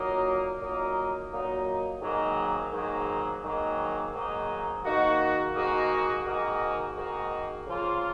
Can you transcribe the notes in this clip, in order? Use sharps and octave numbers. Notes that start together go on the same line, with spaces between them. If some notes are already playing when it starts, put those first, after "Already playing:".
Already playing: A#2 F#3 A#3 D#4
A#2 F#3 A#3 D#4
A#2 F#3 A#3 D#4
G#2 D#3 F#3 A#3 D#4
G#2 D#3 F#3 A#3 D#4
G#2 D#3 F#3 A#3 D#4
G#2 D#3 F#3 A#3 D#4
G#2 D#3 A#3 D#4 F#4
G#2 D#3 A#3 D#4 F#4
G#2 D#3 A#3 D#4 F#4
G#2 D#3 A#3 D#4 F#4
C#3 F3 A#3 F4